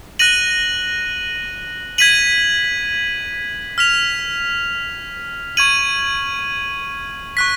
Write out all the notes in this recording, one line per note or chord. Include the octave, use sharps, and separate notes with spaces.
F#6 A#6 D#7 F#7
G#6 B6 D#7 F#7
F6 B6 F7
C#6 G#6 D#7 F#7
C#6 F#6 B6